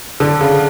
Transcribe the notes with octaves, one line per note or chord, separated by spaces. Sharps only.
D3
C#3